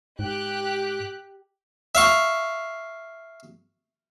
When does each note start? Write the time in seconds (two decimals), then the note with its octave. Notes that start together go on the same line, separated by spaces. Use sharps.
0.19 G#2 G4 F#6
1.95 E5 F5 C#6